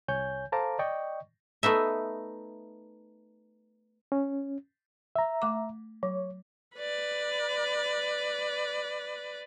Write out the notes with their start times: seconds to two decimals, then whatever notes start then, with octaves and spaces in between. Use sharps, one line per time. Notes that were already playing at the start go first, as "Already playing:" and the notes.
0.08 C2 C#5 G#5 G6
0.52 A4 C5 F5 A5 A#5 D6
0.79 D5 D#5 G5 C#6
1.63 A3 B3 D#4 E5
4.12 C#4
5.16 E5 A#5
5.42 A3 D6
6.03 F#3 C#5
6.77 B4 D5